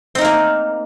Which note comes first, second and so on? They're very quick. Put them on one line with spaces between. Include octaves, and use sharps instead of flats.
C4 D#4 A#4 A#3